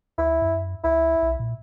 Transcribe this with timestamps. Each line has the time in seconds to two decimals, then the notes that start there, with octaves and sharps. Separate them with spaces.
0.18 D2 E4
0.42 F#2
0.84 C#2 E4
1.22 B1
1.39 A#2